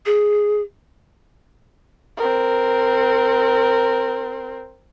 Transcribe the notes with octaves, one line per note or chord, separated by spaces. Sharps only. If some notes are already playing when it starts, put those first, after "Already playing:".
G#4
C4 A#4